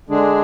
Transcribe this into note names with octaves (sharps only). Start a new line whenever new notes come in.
D3 G#3 D4 G#4